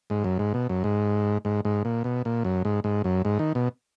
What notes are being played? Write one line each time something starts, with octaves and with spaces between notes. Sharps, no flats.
G#2
F#2
G#2
B2
F#2
G#2
G#2
G#2
A#2
B2
A#2
F#2
G#2
G#2
F#2
G#2
D#3
B2